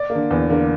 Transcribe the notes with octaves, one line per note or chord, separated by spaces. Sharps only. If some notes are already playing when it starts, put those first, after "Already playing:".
Already playing: D5
A#3
D3
E2
D3 A#3